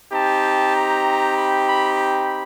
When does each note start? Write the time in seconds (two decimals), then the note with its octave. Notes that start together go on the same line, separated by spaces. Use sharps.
0.12 C4 D#4 G4 A5
0.74 A#5
1.35 B5
1.65 B5
1.95 B5